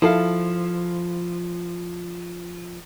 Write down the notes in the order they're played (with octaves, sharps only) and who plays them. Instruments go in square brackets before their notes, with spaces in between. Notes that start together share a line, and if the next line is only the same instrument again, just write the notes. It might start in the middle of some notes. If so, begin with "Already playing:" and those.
[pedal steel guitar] F3 [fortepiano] E4 A4 F5